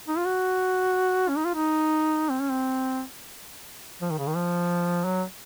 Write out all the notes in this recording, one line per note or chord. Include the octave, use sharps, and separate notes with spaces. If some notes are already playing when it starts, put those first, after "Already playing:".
D#4
F4
F#4
C#4
D#4
F4
D#4
C4
C#4
C4
F3
D#3
C#3
D#3
F3
F#3